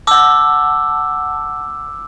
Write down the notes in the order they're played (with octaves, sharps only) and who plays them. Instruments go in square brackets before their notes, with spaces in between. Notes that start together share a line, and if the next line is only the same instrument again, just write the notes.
[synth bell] F#5 A5 [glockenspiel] D6 E6